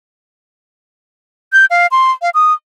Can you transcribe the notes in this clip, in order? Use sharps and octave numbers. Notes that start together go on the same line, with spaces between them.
G6
F5
C6
F5
D#6